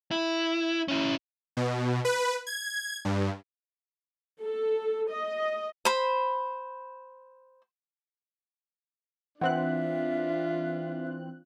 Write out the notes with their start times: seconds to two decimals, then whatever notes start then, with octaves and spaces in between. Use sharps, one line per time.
0.11 E4
0.88 C#4 E4
1.57 B2
2.05 B4
2.47 G#6
3.05 G2
4.41 A4
5.10 D#5
5.85 C5 B5
9.41 E3 C4 D4 F4 E5 F#5 F#6